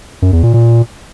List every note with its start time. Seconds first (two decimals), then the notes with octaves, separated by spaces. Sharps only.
0.22 F#2
0.33 E2
0.43 A#2
0.54 A#2